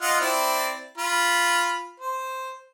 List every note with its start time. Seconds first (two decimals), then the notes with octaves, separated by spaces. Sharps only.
0.02 F4 D#5 F#5
0.21 C4 E4 D5
0.98 F4 B5
2.00 C5